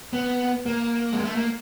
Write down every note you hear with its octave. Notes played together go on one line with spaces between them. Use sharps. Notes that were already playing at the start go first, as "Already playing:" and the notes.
B3
A#3
G#3
A3
A#3